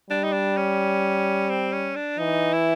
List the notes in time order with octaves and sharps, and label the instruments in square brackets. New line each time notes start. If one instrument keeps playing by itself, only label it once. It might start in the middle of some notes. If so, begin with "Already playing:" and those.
[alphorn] G3 [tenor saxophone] D4
[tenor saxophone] D#4
D4
C#4
C4
C#4
D4
[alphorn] E3 [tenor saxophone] D#4
[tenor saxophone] E4